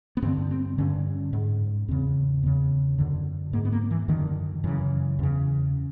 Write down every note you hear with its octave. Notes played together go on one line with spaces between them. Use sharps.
B3
G2 D3 C4
C4
G2 D3 C#4
G#2
E2 C#3 C4
E2 C#3 B3
F#2 D3
G#2 A#3
B3
A#3
E3
F#2 D3 D#3
F#2 C#3 E3
E2 C#3